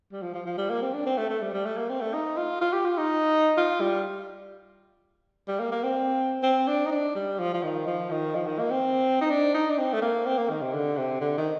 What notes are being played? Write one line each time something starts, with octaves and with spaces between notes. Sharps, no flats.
G3
F3
F3
F3
G3
A#3
C4
D4
C4
A3
A3
G3
G3
A3
A#3
C4
A3
D#4
F4
F4
G4
F4
D#4
F4
G3
G3
A#3
A#3
C4
C4
D4
D#4
D4
G3
F3
F3
D#3
F3
D#3
F3
D#3
A#3
C4
D#4
D4
D#4
D4
C4
A3
A#3
C4
A#3
D#3
C3
D3
C3
D3
D#3